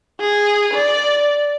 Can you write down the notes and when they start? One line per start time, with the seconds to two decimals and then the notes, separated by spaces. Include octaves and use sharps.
0.20 G#4
0.74 D5